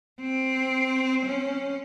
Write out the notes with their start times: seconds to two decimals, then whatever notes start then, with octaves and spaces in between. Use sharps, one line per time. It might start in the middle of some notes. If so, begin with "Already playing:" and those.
0.21 C4
1.25 C#4